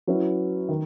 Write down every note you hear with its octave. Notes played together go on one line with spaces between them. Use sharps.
F#3 C#4 E4 B4
D#3